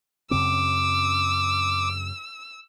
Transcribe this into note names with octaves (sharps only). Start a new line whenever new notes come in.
F#2 C#3 C4 D6 E6